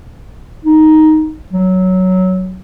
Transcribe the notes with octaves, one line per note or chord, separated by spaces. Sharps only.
D#4
F#3